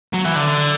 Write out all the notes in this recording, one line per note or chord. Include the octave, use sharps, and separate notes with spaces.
F#3
E3
D3